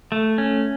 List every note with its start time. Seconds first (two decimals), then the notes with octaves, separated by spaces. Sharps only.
0.12 A3
0.38 C#4